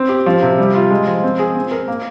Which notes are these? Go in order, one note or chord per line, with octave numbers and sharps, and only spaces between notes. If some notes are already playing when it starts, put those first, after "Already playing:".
Already playing: C4
G4
F3
C3
G3
F4
G#3
F3
C4
G#4
C4
A#4
A#3